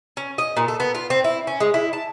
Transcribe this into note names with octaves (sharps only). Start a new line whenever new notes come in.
C#4
D#5
A#2
A4
B3
F4
C4
E4
C#4
G#3
E4
A5